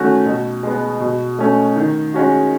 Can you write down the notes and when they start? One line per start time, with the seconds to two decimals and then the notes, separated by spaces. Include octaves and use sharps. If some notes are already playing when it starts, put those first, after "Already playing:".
Already playing: D#3 A3 C#4 F#4
0.26 B2
0.63 G#3 B3
1.00 B2
1.39 A3 C#4
1.76 D#3
2.14 G#3 C#4 F#4